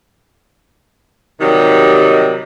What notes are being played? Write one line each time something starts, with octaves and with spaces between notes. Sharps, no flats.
C3 D#3 F#3 G3 D#4